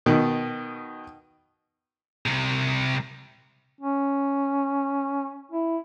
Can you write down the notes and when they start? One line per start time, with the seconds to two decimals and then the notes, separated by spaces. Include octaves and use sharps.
0.06 B2 D#3
2.26 C2 C3
3.81 C#4
5.52 E4